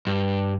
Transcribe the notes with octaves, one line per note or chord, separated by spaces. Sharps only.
G2